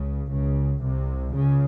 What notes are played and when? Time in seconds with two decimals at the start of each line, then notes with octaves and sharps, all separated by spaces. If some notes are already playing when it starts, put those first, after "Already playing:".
Already playing: C#2 C#3
0.32 C#2 C#3
0.84 C2 C3
1.35 C#2 C#3